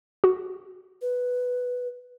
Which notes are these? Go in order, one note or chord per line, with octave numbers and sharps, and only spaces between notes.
F#4
B4